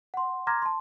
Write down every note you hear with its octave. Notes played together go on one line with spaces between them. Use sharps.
F#5 C6
A#5 C6 D6 F6 G#6 A#6
A5 C6